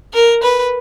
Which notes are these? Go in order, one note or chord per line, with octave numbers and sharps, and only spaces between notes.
A#4
B4